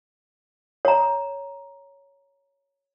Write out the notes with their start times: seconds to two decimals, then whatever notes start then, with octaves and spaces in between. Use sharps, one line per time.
0.85 C#5 A#5